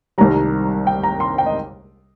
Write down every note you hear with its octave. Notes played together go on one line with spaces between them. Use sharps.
C2 C3 D#3 G3 A#5
G5
A#5
C6
G5
D#5